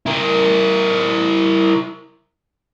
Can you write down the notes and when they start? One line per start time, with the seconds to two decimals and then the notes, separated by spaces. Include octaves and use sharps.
0.06 E4 A#4